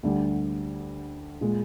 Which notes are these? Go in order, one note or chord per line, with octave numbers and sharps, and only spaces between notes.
D2 D3 G3
A#2 G#3